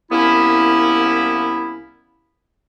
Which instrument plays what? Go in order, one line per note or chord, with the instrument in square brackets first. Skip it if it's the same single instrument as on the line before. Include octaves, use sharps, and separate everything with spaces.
[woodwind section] C2 A#3 B3 C#4 E4